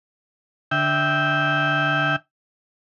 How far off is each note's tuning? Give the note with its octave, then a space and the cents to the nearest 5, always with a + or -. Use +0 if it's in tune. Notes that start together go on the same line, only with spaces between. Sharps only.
D3 +0 E5 -15 G5 +0